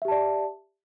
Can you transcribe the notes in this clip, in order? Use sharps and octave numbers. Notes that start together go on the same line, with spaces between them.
G4 D5 E5 A5